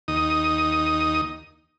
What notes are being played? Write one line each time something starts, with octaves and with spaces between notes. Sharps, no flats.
D#2 D#4 D#6